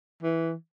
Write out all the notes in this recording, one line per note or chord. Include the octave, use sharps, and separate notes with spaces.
E3